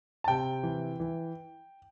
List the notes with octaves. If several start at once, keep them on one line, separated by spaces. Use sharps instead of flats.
A5
C3 G5
E3
E3